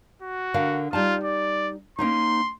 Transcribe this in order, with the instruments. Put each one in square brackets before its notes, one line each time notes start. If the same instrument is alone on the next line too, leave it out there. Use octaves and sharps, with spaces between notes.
[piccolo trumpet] F#4
[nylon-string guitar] D3 A#4 F5
[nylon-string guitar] G3 D#4 A5 [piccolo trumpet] F4
[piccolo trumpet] D5
[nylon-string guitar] A#3 C#4 D#4 [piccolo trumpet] C6